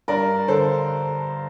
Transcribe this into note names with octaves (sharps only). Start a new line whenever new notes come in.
G2 A#4 D5
D3 A4 C5